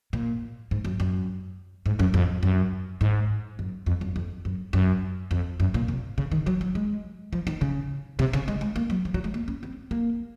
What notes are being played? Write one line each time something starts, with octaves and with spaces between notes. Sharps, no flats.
A#2
G#2
F#2
F#2
G#2
F#2
F2
F#2
G#2
F#2
F2
F#2
F2
F#2
F#2
F2
F#2
A#2
C3
C#3
D#3
F#3
F#3
G#3
F3
D#3
C#3
C3
C#3
G#3
G#3
A#3
F#3
F3
F#3
G#3
A#3
C#4
C4
A#3